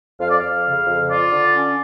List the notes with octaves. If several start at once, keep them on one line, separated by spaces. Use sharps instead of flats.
F2 F5
D5
F2 F5
C#3
F2
F4 D5
D3
C#4